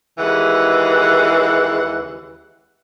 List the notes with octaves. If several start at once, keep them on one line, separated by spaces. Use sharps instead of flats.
D#2 C#3 E3 G#3 F#5